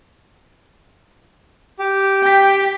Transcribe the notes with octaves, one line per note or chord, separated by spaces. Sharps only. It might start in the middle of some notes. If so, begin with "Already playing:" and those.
G4
G5 B6